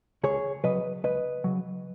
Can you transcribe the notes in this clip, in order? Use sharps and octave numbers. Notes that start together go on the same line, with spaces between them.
C#2 G#4 C#5
C#3 F#3 B4 D#5
C#2 B4 D#5
C#3 F#3